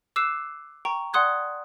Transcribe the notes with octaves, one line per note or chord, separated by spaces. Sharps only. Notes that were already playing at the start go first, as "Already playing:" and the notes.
D6 E6 F#6 C7 E7
G5 A#5 C#6
D5 F#5 C6 D#6 F#6 G#6